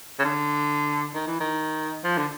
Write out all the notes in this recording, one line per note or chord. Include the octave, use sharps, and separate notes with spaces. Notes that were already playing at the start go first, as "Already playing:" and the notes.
C#3
D3
D#3
E3
D#3
F3
D3